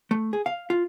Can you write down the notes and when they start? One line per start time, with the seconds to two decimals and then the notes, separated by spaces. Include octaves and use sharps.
0.11 A3
0.33 G#4
0.46 F5
0.70 F4